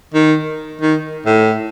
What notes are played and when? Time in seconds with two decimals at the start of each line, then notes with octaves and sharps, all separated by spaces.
0.14 D#3
0.82 D#3
1.26 A2